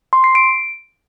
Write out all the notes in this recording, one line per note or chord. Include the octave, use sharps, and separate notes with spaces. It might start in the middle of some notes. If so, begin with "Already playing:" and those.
C6
C7
D7